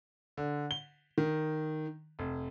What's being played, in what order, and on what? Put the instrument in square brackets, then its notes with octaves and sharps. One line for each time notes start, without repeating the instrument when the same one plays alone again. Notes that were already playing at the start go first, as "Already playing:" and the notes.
[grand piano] D3
G7
D#3
F1